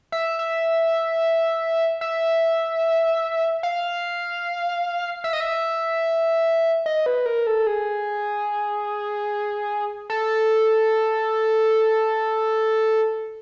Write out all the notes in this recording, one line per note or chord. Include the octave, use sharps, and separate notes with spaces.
E5
E5
E5
F5
E5
D#5
E5
D#5
B4
A#4
A4
G#4
A4